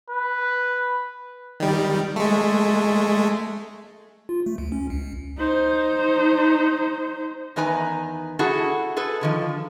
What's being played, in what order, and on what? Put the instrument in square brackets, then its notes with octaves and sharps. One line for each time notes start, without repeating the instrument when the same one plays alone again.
[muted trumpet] B4
[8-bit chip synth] D#3 G3
G#3 A3
F4
A3
D2
C#4
C#2
[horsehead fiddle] D#4 C5
[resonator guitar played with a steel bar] E2 D#3 D#4 B4 G#5 A#5
E4 F#4 G#4 A4
G#4 A4 B4
D3 D#3 F3